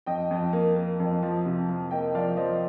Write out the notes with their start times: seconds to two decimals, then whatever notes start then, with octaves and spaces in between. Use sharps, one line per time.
0.06 F2 D#5 G5
0.31 F2
0.53 A#3
0.76 A#3
1.00 F2
1.23 F3
1.45 C3
1.69 F3
1.91 A#3 D#5 G5
2.15 F3 D5 F5
2.37 F3 C5 D#5